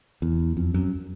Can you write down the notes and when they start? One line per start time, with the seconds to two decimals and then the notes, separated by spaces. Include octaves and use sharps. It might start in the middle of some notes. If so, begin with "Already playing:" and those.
0.22 E2
0.57 F2
0.74 F#2